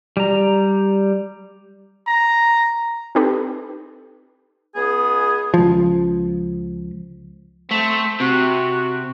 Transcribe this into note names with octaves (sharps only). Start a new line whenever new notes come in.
G3 A#5
A#5
C4 D#4 G4 A4 B4
C#2 B3 G#4
C#2 F3
A3 C4
C3 F#4